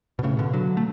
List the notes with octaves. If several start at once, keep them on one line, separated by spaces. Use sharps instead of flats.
B2
A2 C#3
B2 D3
D3 F#3
A3